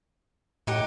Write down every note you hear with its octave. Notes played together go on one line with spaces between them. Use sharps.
A2 D#4 G4 F#5